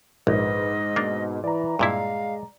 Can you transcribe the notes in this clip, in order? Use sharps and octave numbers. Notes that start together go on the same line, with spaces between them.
A#1 G#2 B4 D#5 E6
B2 A#3 D4
E3 D5 A#5
G2 A#2 G#3 E4 F5